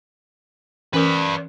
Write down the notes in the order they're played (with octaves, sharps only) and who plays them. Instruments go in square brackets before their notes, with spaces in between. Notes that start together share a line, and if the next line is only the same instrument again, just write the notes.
[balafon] E3 C#4 A#4 [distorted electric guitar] B4 D5